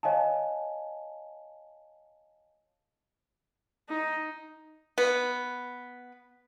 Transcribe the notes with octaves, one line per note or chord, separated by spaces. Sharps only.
C#5 D#5 F5 G#5 A5
D#4
B3